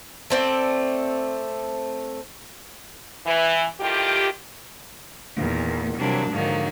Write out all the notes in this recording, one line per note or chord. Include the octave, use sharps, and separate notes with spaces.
A3 C4 D5
E3
A2 D#3 F4 G4
E2 A#2 D#3
C3 E3 F#3 G3 A#3 D4
G#2 D3 D#3 F3 F#3 A#3